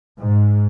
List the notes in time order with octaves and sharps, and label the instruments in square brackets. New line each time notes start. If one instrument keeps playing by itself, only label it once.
[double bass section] G#2